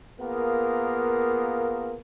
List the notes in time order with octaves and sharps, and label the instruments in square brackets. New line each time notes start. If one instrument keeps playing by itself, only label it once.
[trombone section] A#3 B3 F4 G#4 A#4